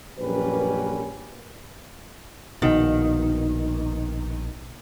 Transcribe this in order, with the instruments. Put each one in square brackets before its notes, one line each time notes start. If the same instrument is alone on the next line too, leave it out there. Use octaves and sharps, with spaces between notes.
[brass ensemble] A#1 F#2 G3 A#3 C#4 B4
[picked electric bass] A#1 B2 [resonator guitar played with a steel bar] D#3